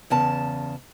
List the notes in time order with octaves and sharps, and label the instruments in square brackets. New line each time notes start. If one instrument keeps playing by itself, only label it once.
[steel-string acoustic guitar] E2 C#3 A5